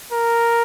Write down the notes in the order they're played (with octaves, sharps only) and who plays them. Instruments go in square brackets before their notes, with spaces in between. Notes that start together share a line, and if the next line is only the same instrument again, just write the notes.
[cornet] A#4